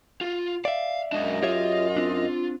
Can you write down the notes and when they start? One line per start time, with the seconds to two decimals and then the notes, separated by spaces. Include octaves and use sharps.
0.21 F4
0.65 D5 E5 F5
1.12 F#2 G#3 D4 D#5
1.43 F4 G4 C#5 E5
1.96 C4 D4